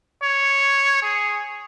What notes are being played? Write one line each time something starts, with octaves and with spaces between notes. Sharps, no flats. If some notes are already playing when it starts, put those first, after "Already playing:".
C#5
G#4